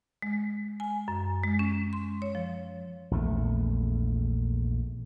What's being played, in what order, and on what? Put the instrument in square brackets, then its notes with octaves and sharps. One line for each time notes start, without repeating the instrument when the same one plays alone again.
[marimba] G#3
G#5
F#2
G#3
C#4
C6
C#5
F3
[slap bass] A#1 E2 A3